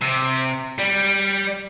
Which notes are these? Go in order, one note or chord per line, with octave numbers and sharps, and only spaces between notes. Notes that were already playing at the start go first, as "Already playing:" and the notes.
C3
G3